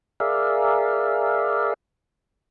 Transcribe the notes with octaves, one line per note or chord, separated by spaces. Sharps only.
G#4 A#4 D5 E5 F5